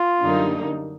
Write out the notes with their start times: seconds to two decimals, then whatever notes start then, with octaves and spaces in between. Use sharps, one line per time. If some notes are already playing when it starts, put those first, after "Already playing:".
Already playing: F4
0.22 F#2 D3 G3 A#3 D#4